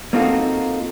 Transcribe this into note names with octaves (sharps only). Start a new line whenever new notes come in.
A#3 C4 D#4 F4 F#4 A4